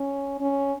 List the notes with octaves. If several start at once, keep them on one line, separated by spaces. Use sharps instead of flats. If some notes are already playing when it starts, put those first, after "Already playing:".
Already playing: C#4
C#4